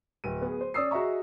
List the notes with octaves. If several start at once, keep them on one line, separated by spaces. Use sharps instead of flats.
D1 D#7
B3 G#4
C5
C#4 D5 D#6 E6 C7
F#4 G#4 D#5 E5 A#5 C#6